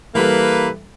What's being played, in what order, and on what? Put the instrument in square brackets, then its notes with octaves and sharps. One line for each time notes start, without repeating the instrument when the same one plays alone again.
[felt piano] E3 G3 A4 [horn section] A#3 B4